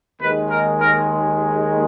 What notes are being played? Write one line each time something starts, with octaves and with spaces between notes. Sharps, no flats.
D#2 D#3 G#3 B4
A#4
A#4